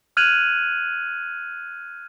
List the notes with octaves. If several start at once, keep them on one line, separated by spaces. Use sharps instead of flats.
F6 F#6 G#6 D#7 F7 F#7